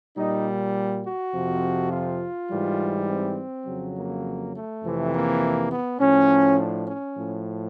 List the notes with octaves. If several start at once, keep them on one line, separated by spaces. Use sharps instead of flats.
A#2 G3 D#4
F#4
F2 C3 F3
F4
G#2 E3 G3
C4
F2 C#3 F#3
A#3
A3
F2 C3 E3
A#3
B3
A2 F3 C#4
D4
C#4
A2 F3